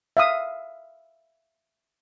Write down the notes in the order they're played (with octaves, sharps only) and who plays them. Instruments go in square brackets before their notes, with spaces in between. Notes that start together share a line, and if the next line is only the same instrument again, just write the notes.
[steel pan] E5 F5 D#6